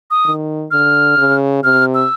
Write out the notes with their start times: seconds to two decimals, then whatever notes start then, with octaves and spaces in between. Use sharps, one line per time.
0.11 D#6
0.25 D#3
0.71 D3 F6
1.18 C#3
1.63 C3 F6
1.95 E6